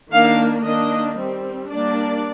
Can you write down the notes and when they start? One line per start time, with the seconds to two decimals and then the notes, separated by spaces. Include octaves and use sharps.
0.12 D#3 A#3 D4 F5
0.65 D#3 A#3 D4 D#5
1.17 G3 C4
1.70 G3 A#3 D4 D5